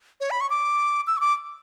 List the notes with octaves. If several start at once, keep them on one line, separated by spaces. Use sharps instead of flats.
C#5
B5
C#6
D6
E6
C#6
D6